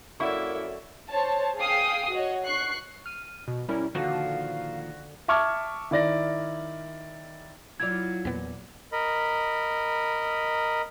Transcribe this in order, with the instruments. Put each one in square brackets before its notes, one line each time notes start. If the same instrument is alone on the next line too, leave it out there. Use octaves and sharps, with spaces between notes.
[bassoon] F#2 [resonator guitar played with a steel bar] A#3 E4 [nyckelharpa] A4 E5 [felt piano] D5 F#5 C#6
[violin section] C5 C#5 A5
G#4 F5 G5 D#6 C7
F#4 C#5 D#5
C#6 F#6 C7
[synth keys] F6 D#7
B2
G3 C#4 E4 A#4
[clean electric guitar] A#2 D#3 F3 [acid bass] D3 [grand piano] F#4 [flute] F5
[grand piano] E5 A5 C#6 D6 F6 G#6
D#3 E4 D5 A#6
[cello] F#3 [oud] E4 F4 D5 [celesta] G#6
[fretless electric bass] E2 B3 [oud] A#2
[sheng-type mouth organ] A#4 D#5 B5